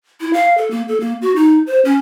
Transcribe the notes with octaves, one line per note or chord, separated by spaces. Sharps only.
E4
F5
A4
A#3
A4
A#3
F#4
D#4
C5
C#4